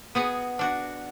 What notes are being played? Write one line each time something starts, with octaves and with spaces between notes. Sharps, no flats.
B3 F#4 G#4
D4 F#4